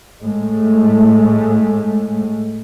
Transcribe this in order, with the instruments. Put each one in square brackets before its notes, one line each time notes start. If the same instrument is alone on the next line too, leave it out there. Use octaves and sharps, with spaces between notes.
[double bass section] A2 G#3 A3